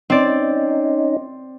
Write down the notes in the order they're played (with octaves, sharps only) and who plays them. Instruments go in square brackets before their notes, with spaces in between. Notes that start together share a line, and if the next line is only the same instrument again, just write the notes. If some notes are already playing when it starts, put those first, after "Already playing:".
[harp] C4 D5 [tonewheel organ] C#4 D#4